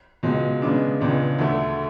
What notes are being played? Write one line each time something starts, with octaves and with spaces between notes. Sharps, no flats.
C#2 B2 G#3
C#3 G#3 B3 D4
C#2 C#3 G#3 B3 D4
D2 D3 A3